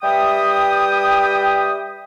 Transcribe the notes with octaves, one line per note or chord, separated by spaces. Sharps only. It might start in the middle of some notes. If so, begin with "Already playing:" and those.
G3 B4 E5 G5 D#6